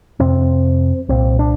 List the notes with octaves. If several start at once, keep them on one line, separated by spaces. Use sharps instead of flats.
F2 C3 C4
C2 A#2 C4
D4